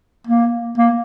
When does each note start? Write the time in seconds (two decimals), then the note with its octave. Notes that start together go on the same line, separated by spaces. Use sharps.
0.27 A#3
0.78 A#3